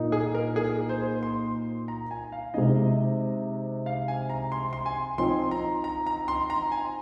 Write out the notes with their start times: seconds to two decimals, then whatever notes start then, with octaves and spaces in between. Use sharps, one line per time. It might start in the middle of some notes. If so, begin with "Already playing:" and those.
Already playing: A#2 A#3 D#4
0.12 G#4
0.34 A#4
0.56 G#4
0.89 C5
1.23 C6
1.88 A#5
2.11 G#5
2.32 F5
2.54 C3 G#3 D#4 D#5
3.86 F5
4.08 G#5
4.30 A#5
4.52 C6
4.73 C6
4.86 G#5
5.18 F3 C4 D#4 C6
5.51 A#5
5.84 A#5
6.07 A#5
6.28 C6
6.50 A#5
6.72 G#5